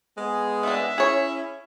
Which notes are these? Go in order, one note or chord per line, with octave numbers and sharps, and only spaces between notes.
G#3 B3 G#4
D#3 D4 E5
C#4 E4 G#4 C#5